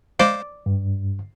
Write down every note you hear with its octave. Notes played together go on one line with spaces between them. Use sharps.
G#3 C5 D5 F5
G2